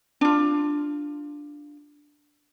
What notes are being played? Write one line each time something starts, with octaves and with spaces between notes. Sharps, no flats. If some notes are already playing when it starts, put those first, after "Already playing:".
D4 F4